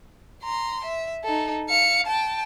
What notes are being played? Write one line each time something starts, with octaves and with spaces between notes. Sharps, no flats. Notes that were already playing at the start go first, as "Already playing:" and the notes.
A#5 C6
E5
D#4 A4
F5 C#7
G5 A5